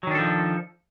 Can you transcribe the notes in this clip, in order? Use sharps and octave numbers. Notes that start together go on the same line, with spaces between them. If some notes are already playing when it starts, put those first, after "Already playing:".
D#3 F3 F#3 D4 A4